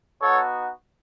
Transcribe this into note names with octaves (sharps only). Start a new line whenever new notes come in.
B3 D#4 F#4 A4 C#5